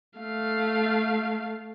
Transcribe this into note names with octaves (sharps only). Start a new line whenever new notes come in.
A3 F5